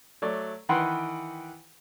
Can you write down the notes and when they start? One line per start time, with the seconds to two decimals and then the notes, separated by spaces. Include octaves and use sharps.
0.22 F#3 A3 D5
0.69 D#3 E3 B4 F#5 G5 C6